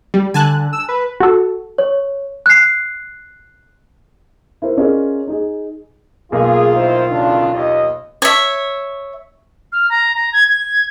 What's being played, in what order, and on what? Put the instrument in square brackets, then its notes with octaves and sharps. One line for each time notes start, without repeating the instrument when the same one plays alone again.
[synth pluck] G3
[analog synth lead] D3 [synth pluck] G#5 A5 F#6
[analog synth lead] E6
B4
[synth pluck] F#4 A4
[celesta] C#5
F#6 C7
[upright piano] E4 A#4 C5
C#4 F4 G#4 A#4 D5 D#5
D#4 G#4
[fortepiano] B1 A#3 [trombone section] D#3 F4 [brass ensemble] G#4
[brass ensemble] D#4 E4 C5
D2 C#3 D4
D#2 D#5
[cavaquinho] C#5 E5
[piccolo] F6
A#5
A#5
G#6
G#6